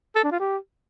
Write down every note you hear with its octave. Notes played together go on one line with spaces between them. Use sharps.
A4
D4
F4
G4